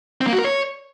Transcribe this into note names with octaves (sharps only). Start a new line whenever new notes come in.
C4
A#3
F#4
A#4
C#5